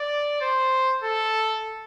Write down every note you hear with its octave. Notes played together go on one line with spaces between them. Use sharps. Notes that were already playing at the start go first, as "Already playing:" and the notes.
Already playing: D5
C5
A4